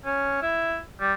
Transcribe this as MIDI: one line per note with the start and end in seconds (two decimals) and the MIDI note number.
0.05 0.39 61
0.42 0.80 64
1.00 1.13 55